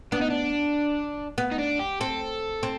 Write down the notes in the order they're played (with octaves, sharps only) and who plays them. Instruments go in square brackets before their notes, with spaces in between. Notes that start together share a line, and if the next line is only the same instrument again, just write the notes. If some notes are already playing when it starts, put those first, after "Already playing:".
[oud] B3 [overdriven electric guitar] D4
[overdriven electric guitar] D#4
D4
[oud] B3
[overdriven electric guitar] D#4
D4
G4
[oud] C4 [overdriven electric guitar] A4
[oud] C4